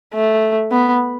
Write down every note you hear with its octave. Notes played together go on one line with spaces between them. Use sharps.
A3
B3